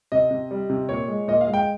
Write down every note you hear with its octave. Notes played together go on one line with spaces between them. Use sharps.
C3 D#5
C3
G3
C3
A#2 C#5
G#3
A#2 D#5
F5
G#3
G5